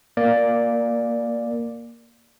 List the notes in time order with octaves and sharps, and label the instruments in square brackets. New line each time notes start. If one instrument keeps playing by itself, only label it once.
[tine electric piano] A#3 D5